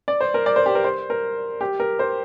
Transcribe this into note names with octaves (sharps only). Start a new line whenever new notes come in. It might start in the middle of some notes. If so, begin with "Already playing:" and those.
D5
C5
A#4
D5
C5
G4
A#4
C5
A#4
G4
A#4
C5